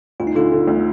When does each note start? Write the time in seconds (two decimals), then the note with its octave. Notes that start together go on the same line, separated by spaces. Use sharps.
0.20 D2 F4
0.27 D#4
0.35 D3 F4
0.52 D3
0.67 D2